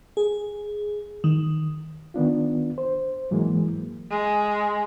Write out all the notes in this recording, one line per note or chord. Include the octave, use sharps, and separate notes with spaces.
G#4
D#3
D#3 B3 D4 F4
C5
G#2 E3 F#3 G#3 A#3
G#3